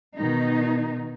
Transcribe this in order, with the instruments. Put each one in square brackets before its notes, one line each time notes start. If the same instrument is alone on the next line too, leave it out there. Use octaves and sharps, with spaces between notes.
[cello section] B2 D#3 D#4